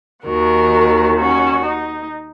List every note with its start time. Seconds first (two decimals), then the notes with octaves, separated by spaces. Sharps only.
0.25 D#2 D#3 F#4 A#4
1.17 C#4 F#4
1.64 D#4